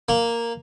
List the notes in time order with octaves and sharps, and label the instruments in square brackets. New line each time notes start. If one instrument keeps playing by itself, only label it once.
[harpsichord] A#3